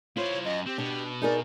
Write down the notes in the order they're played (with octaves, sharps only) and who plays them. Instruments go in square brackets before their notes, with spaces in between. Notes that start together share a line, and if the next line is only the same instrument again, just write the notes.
[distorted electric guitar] E4 C5 [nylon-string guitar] F4 [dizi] C#5
[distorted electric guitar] F#2 [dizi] D#5
[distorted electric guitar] C4 [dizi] G4
[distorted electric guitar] B2 [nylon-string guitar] D4
[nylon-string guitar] D#4 G#4 A#4 [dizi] D5